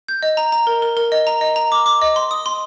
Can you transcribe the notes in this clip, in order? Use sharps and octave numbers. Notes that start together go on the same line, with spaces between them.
G6
D#5
A#5
A#5
A#4
A#4
A#4
D#5
A#5
D#5
A#5
D6
D6
D#5
C6
D#6
C6